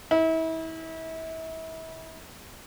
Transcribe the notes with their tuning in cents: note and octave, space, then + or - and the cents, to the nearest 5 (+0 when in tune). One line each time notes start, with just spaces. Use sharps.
E4 -35